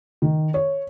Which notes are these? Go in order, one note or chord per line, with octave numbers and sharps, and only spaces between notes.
D#3
C#5